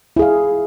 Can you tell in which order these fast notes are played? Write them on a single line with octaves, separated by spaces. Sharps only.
E4 G#4 F5